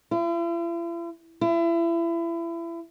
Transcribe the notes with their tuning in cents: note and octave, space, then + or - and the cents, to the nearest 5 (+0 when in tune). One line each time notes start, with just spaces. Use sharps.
E4 +45
E4 +30